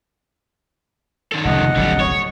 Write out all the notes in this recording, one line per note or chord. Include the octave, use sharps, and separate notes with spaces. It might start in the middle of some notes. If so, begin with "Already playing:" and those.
D#3 A4
F1 C#2 C3 D#5 F#5
D1 G#1 D3 F#3 G3
C#5